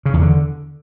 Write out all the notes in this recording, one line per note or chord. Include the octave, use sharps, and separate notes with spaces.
C#3
E2
D3